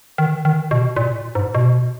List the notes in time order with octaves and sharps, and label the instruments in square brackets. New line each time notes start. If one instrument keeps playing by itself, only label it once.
[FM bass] D#3
D#3
B2
A#2
G#2
B2